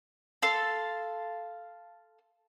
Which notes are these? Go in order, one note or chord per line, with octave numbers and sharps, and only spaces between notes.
A4 F5 C6